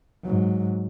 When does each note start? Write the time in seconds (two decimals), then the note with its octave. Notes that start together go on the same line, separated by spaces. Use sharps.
0.23 G#2 F#3